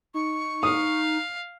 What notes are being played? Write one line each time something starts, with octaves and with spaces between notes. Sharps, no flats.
D#4 C#6
F5 D#6